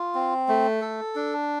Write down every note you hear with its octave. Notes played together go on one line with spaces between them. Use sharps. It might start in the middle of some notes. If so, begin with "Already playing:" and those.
Already playing: F4
C4
A3
A4
D4